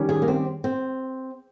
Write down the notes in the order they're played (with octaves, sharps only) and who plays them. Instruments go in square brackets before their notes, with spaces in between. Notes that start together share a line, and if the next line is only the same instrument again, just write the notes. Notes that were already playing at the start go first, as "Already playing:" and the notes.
Already playing: [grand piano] D#3 G3 C#4 G4
[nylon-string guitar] G#4
A#3
C4
C4